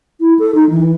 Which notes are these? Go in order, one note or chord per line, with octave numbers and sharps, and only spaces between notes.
E4
A4
D#4
E3